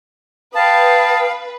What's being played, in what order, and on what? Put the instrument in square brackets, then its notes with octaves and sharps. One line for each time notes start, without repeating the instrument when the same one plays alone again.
[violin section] B4 [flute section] F5 G5 D#6 [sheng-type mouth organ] A5